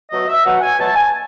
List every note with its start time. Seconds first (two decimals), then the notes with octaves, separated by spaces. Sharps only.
0.10 B2 F#3 A3 D#5
0.28 E5
0.44 B2 F#3 A3 F#5
0.61 G#5
0.78 B2 F#3 A3 A5
0.95 G#5